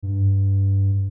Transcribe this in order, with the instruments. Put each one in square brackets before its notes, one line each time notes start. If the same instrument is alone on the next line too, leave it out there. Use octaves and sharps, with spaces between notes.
[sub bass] G2